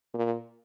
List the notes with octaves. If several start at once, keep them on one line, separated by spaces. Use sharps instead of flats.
A#2